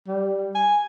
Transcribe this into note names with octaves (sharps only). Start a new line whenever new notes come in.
G3
G#5